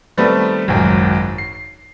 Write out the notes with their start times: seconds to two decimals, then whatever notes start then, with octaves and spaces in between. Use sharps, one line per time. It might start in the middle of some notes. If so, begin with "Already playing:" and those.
0.17 D#3 G3 A3 B3 C4
0.68 G#1 C#2 F#2
1.38 C7